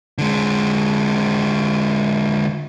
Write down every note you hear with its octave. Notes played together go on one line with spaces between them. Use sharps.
D3 G#3